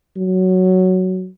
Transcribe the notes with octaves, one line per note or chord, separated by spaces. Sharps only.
F#3